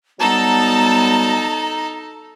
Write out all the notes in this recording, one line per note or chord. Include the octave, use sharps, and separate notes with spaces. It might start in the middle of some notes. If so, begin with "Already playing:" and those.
F#3 G3 B3 D#4 A4 A5 A#5